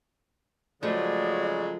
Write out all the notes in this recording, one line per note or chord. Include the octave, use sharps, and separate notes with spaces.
C#3 F3 F#3 G#3 A3 D5